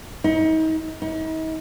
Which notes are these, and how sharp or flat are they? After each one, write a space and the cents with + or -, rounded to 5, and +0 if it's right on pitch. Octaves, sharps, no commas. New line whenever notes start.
D#4 +35
D#4 +40